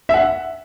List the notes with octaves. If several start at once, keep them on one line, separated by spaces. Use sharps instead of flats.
E5
F#5